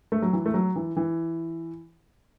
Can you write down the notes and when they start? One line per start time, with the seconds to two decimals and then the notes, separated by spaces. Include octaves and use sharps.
0.12 A3
0.22 F#3
0.33 E3
0.46 A3
0.54 F#3
0.76 E3
0.97 E3